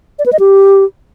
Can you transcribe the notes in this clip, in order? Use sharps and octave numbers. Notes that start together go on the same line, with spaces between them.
D5
B4
D#5
G4